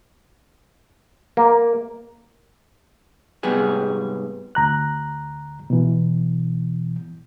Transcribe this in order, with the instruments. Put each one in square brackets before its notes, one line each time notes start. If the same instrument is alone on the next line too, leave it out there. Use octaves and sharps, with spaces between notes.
[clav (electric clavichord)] A#3
[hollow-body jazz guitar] G#2 C3 G3 B3 G#4
[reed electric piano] D2 A#5 F#6
B2 E3